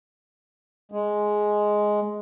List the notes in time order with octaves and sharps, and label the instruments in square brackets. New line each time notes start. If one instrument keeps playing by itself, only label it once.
[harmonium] G#3